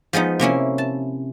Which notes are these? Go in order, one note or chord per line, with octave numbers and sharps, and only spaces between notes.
F3 G#3 B3 D#4
C3 A#3 C#4 E4
A5